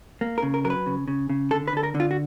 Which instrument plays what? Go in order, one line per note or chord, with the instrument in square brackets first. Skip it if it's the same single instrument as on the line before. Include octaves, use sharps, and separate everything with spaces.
[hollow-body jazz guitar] A#3
A#4
C#3
A#4
F#3 A#4
B4
C#3
C#3
C#3
D3 A4
B4
D3 A4
A#4
D3
F4
F#4